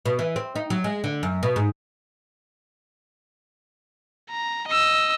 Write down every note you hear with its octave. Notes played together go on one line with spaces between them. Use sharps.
B2
E3
C4
D#4
F#3
G#3
D3
F#2
B2
G#2
A#5
D#5 E6